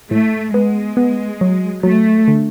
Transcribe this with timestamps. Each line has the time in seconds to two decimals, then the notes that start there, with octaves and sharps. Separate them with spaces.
0.11 A2 A3
0.54 G#3 B3
0.97 B3
1.41 F#3
1.83 F#3 A3
2.28 D3